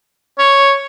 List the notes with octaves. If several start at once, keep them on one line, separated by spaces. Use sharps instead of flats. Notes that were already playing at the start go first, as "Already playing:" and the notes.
C#5